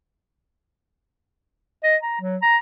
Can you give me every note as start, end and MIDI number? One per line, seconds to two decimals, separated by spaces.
1.84 1.96 75
2.03 2.17 82
2.21 2.37 54
2.42 2.57 82